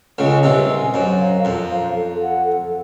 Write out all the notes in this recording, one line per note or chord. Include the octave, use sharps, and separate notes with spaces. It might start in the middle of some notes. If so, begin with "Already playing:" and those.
C#2 C#3 D#5 G#5
C2 C3 B4
D#5 G#5
F#2 C5
F5 A#5
F2 C5
F5 A#5
A4
C#5 F#5
A4